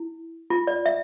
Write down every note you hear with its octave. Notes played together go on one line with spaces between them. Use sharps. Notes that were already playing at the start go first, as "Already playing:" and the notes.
Already playing: E4
F4
D5
E5